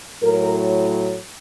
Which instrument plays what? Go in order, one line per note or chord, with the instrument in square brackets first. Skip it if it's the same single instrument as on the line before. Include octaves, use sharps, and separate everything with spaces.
[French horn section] A2 F#3 A#4